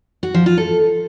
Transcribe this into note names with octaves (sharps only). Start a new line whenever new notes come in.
F#4
F3
F4
A4